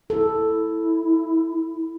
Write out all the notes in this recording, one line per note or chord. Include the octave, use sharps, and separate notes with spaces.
E4 A4